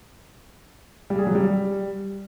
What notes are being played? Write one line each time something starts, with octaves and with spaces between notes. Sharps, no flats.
G3
G#4
F#3
G3